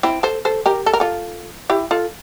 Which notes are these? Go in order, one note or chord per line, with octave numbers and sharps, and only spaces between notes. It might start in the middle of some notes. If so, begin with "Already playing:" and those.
C4 E4
A4 C5
A4 C5
G4 A#4
A4
A#4
F4 A4
E4 G4
F4 A4